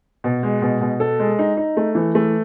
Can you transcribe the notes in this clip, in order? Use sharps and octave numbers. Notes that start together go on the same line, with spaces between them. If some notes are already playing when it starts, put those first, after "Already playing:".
B2
G#3
B2
B2
A4
G#3
D#4
D#4
A3
E3
A3